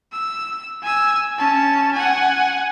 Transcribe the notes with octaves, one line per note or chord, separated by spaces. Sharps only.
E6
G#5 E6
C#4 A5
F#5 G#5